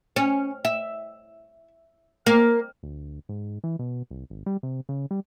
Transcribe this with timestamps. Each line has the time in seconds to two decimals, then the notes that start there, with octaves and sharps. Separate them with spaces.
0.16 C#4
0.65 E5
2.26 A#3
2.83 D2
3.29 G#2
3.64 E3
3.79 B2
4.11 C2
4.30 G#1
4.46 G3
4.63 C3
4.89 C#3
5.11 G3